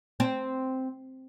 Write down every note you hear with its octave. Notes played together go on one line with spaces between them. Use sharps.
C4